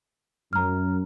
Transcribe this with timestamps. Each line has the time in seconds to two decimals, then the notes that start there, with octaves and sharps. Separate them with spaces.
0.53 F#2 A#5 F6